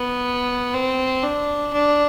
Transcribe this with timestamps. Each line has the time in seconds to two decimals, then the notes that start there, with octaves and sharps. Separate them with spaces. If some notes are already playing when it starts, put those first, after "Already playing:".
Already playing: B3
0.74 C4
1.23 D4
1.73 D4